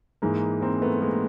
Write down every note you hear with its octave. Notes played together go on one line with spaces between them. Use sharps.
G#2 E3 G#3 A#3
A#3 C4
A3 B3
G#3 A#3